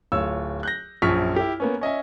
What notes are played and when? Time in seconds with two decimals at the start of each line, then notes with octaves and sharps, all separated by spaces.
0.12 D1 F4 C#5 E6
0.63 F#6 G6 A#6
1.02 A#1 F#2 F3 C#6 F6 B6
1.36 E4 G4
1.60 A#3 B3 C#4
1.81 C#4 D#5 E5 G#5